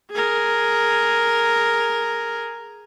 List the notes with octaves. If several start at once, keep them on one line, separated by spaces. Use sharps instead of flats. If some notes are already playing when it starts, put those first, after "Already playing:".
G#4 A#4